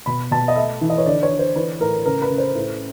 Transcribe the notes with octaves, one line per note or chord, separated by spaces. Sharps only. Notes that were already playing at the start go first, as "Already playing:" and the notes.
B2 B5
B2 A5
D#5
A3 E5
E3
D#5
C#5
D3 D5
C#5
D3
C5
E3 B4
A2 A#4
C#3 A#4
B4
C#3
C5
A2